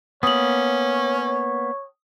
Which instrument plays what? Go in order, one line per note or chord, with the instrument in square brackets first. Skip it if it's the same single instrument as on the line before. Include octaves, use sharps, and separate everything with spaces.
[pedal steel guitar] A#3 B3 [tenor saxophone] C#4 [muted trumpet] C#5 [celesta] D#6 F#7